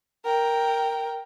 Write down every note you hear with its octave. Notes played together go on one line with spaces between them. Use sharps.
A#4 G5